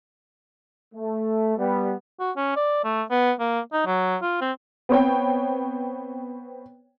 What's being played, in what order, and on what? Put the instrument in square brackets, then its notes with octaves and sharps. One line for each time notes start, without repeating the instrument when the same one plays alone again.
[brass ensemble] A3
G3 B3
[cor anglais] F#4
C#4
D5
A3
B3
A#3
D#4
F#3
F4
C4
[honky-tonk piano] B3 C4 C#5 G5